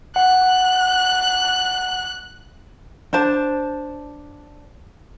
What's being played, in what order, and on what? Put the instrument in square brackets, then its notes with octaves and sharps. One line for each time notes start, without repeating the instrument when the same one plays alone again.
[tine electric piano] F#5 [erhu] F#6
[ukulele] D4 C5 A5